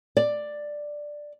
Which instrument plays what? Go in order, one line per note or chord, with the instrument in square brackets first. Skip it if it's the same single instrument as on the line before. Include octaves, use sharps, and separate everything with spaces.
[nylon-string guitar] D5